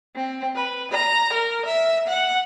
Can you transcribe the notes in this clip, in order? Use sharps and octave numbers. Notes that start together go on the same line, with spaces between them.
C4
B4
A#5
A#4
E5
F#5